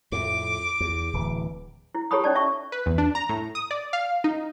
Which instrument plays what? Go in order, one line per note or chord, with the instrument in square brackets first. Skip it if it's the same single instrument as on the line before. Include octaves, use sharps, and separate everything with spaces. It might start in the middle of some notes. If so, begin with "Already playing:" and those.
[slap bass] F2 A2 [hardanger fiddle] D6
[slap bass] E2
D1 E3
[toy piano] E4
G4 A4 C#5 A5 B5 D#6
C#4 D#4 D5 A5
E5 A5 C#6
[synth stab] B4
E2
D4
A#5
A2
D#6
D5
F5
D#4